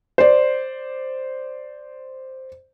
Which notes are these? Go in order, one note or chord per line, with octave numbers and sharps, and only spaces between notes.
C5 D5